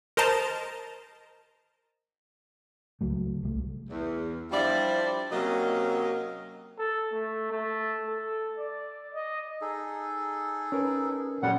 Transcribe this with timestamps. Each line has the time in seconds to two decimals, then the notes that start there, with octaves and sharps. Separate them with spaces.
0.17 A#4 C5 D#5 A5 A#5
3.01 C#2 F#3 A3
3.43 C2 G3 A3
3.89 E2
4.51 F3 G3 D4 E4 C5 D5
5.31 C3 F#3 A#3 C#4 D#5
6.79 A4
7.13 A3
7.51 A3
8.08 A4
8.59 D5
9.14 D#5
9.61 D#4 G#4 A4
10.72 C#4 A#4 B4
11.43 F2 A#2 F#3 G3 C#4 F#5